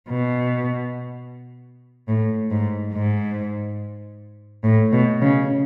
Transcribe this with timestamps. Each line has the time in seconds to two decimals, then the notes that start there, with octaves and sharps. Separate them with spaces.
0.08 B2
2.08 A2
2.50 G#2
2.93 G#2
4.64 A2
4.92 B2
5.21 C#3